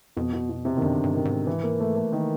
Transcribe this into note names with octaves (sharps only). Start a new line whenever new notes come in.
F2 B2
B2
B2
C3
D#3
F#2 D3
G2
D#3
G#2
E3
A#3
A3
A3
D#3